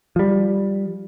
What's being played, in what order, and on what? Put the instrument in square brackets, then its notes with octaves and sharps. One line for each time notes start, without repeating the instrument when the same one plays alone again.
[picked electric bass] F3 G3